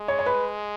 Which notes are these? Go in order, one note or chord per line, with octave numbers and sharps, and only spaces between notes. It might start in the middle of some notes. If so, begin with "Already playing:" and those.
Already playing: G#3
C#5
C#5
B4